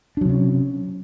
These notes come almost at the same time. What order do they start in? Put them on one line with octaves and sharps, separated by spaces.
D4 F#3 C3 C#4